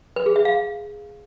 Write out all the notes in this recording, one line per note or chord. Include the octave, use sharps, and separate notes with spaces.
B4
G#4
E5
F5